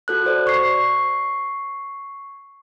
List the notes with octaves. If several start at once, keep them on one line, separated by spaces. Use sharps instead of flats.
F#4 A4 F#6
F#4 C5 D5
C#6 G#6 C7